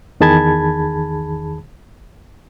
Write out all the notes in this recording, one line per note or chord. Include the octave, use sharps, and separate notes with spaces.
E2 D#3 G#4 A5 B5 G#6